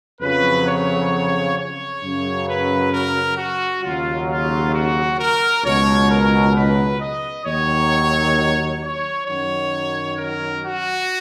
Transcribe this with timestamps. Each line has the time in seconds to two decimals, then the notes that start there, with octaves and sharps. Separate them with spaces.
0.20 F2 C#3 F#3 B4
0.66 C#5
1.56 C#5
2.02 F#2 C#3 F#3
2.47 B4
2.92 A#4
3.37 F#4
3.83 D#2 C#3 F#3 F4
4.28 F4
4.73 F#4
5.19 A#4
5.64 C#2 B2 F#3 C#5
6.10 A#4
6.55 B4
7.00 D#5
7.46 D#2 D#3 F#3 C#5
8.82 C#5
9.27 F#2 D#3 F#3 C#5
10.17 A#4
10.63 F#4